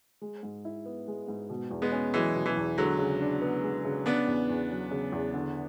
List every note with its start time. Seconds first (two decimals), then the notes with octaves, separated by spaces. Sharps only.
0.21 G#3
0.43 G#2
0.65 E4
0.86 B3
1.08 G#3
1.28 G#2
1.50 B2
1.71 E2
1.82 G#3 B3
1.92 C#4
2.14 E3 F#3 G#3
2.36 B2
2.46 E3
2.57 E2
2.78 D3 F#3 G#3
2.99 C#3
3.21 D4
3.42 B3
3.63 G#3
3.85 C#3
4.06 C#3 B3 D4
4.27 E2
4.49 E2
4.70 F#3
4.91 C#3
5.12 E2
5.34 D3